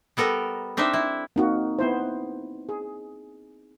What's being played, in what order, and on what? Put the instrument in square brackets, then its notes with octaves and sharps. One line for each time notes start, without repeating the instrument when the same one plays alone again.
[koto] G3 B3 A4 A#4 A#5
C4 D4 D#4 C5 E5
E4
[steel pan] A#3 F#4 [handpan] C4 D#4
[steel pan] B3 E4 C5
G#4